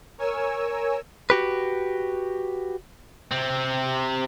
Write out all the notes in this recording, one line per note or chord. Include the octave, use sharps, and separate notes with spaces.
A#4 C#5 G#5 E6
F#4 G4 B4
C3 C4